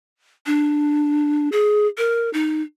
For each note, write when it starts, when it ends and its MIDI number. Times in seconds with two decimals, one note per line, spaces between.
0.46 1.49 62
1.52 1.87 68
1.98 2.32 70
2.33 2.62 63